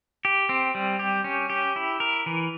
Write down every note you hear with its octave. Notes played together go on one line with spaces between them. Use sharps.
G4
C4
G3
G4
C#4
G4
E4
A#4
E3